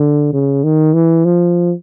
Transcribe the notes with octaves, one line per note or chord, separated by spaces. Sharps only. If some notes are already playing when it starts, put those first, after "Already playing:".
Already playing: D3
C#3
D#3
E3
F3